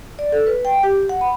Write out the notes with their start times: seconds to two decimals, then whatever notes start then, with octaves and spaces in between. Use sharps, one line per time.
0.19 D5
0.32 A4
0.47 B4
0.65 G5
0.83 G4
1.09 F#5
1.21 B5